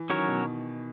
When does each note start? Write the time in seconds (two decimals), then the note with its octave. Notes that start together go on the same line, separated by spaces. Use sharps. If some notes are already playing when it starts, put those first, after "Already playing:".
Already playing: E3
0.10 D#3 F#3 C#4 F#4 A#4 C#5
0.28 B2